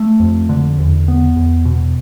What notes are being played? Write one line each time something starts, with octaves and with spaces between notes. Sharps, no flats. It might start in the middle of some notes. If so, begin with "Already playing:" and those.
Already playing: A3
F2
D3
E2
B3
E2
B2